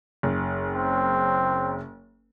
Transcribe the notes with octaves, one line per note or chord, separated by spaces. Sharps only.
F#1
C4